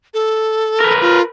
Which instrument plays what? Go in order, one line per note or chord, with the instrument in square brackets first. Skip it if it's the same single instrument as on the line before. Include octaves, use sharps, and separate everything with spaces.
[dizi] A4
[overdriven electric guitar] A#4 B4
[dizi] F4